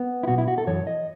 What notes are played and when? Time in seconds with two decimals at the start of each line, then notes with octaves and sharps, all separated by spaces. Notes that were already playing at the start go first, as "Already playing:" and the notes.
Already playing: B3
0.23 E4
0.27 B1 B2 F#4
0.38 E4
0.48 F#4
0.58 A4
0.67 F#2 E3 C#5
0.87 D#5